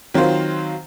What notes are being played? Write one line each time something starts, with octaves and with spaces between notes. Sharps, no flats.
D#3 F#3 C4 F4 C5